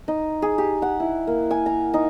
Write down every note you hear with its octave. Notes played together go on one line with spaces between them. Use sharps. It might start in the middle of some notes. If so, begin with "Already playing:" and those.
D#4
G#4
G4
F#5
E4
A#3
G#5
A#5
D#4